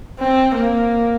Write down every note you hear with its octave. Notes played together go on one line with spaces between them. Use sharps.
C4
A#3